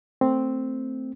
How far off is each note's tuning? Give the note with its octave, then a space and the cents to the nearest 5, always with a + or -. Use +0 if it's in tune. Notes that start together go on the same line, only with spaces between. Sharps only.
A3 +20 C4 +0